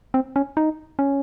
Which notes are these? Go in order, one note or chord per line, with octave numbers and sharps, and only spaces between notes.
C4
C#4
D#4
C#4